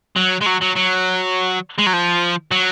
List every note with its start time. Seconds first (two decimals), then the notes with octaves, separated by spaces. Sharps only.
0.16 F#3
0.41 G#3
0.46 F#3
0.61 F#3
0.76 F#3
1.78 G#3
1.86 F#3
1.93 F3
2.51 F#3